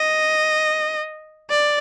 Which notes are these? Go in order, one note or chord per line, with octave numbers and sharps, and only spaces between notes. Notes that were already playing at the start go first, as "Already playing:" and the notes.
Already playing: D#5
D5